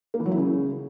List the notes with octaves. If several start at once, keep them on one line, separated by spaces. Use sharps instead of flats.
A#3
E3
F#3
E4
C#3